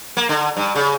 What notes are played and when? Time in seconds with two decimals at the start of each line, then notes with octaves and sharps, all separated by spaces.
0.17 A#3
0.29 D3
0.57 G2
0.75 C#3